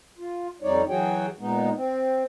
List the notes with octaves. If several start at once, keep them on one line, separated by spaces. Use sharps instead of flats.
F4
F2 G3 D#4 C#5 D5
E3 F#3 F#4 G#4 C#5 G5
A#2 G#3 B3 D#4
C4